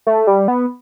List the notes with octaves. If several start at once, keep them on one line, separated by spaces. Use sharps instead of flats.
A3
G3
B3